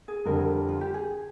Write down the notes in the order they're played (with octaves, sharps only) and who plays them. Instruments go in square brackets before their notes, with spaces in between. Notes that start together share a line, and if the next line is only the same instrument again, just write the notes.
[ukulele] G#4
[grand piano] F2 D3 G3 [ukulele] A#4
[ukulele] F4
G4
G#4